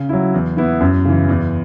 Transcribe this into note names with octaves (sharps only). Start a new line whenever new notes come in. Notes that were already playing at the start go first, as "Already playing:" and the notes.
Already playing: C#3
F#3 E4
E2
E3 B3 E4
F#2
C#3 E3
E2